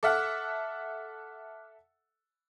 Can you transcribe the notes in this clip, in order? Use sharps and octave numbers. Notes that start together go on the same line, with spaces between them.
A4 E5 F#5 D6 F6 F#6